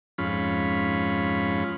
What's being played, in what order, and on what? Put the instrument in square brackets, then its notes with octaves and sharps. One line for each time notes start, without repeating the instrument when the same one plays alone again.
[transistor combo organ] F2 G#2 C#4 F4 B5